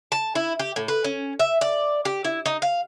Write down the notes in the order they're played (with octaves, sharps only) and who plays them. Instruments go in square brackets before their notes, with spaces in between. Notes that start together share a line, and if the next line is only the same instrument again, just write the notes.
[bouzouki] A5
E4
G4
A2
B4
C#4
E5
D5
G4
E4
D#4
F5